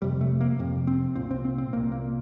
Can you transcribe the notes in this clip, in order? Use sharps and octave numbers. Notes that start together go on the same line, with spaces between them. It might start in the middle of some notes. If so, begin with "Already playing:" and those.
F2 C3 G3
A3
A#3
F2 C3
C4
C2 A#2 C4
C4
C4
C4
C2 A#2 A#3
A#3